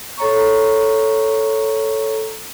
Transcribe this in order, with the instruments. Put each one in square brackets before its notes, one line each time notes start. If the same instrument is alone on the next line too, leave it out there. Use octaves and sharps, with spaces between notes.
[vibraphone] A4 C#5 A#5 C#6